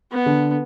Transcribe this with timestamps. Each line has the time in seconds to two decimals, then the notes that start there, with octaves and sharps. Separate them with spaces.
0.12 B3
0.26 D3